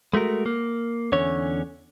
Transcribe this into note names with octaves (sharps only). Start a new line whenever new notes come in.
G#3 A3 F#4 A#4
A#3
E2 D3 C#4 C#5